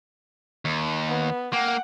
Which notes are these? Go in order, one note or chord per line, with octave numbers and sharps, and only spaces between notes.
D#2
B3
A#3 F#5 G5